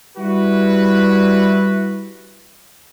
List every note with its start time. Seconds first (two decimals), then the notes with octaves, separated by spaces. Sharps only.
0.18 G3 E4 F#4 B4